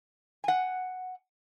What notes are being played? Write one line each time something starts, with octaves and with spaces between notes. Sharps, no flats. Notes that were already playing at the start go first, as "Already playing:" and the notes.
F#5 G#5